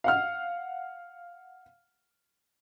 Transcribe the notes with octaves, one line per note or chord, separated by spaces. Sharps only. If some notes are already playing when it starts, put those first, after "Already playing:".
F5 F#5 F6